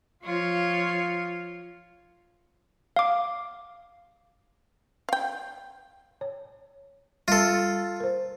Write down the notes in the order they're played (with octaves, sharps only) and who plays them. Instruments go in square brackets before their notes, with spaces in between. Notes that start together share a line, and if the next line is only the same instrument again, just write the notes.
[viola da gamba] F3 F4 C#5
[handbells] F5 D6
[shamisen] F5 G5
[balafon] C#5
[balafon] G3 [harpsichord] F4 A4
[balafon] A#4 C5